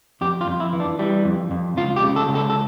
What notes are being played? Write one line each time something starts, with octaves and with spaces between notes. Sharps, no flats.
F2 G4
F4
F2
E4
E3
D4
E3 G3
F2
F2
C#2 F4
G4
C#3
A4
C#2
A4
A4